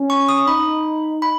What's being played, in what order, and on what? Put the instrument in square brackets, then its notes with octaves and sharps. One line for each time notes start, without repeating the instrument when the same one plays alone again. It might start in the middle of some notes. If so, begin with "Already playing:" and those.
Already playing: [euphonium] C#4
[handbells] C#6
D#6
[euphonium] D#4 [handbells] B5
[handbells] B5